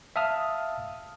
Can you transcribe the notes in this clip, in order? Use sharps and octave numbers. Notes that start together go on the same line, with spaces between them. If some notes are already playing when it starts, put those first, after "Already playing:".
E5 F5 A5 D#6 F6